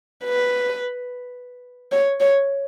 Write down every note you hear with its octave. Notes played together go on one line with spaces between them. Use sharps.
B4
C#5
C#5